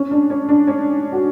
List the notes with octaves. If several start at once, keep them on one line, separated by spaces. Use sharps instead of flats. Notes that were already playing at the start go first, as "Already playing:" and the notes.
Already playing: C#4
D4
C#4
D4
C#4
F#4